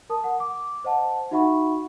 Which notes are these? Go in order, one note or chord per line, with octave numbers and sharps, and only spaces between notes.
A#4 A5 D#6
F#5
D6
C5 D#5 F#5 A5
D#4 F#4 E5 F#5 B5 C#6